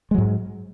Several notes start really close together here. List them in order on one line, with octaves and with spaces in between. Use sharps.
G#3 F#3 G#2